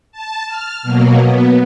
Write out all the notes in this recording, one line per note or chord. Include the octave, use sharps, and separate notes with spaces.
A5
F6
B2 F#3 A#3
B3